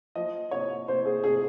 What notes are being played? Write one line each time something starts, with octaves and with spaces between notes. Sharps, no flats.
F3 D#5
C3 C#5
C3 C5
G#4
C3 G#4